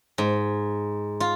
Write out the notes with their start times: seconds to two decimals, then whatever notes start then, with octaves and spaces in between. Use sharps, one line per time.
0.18 G#2
1.20 F4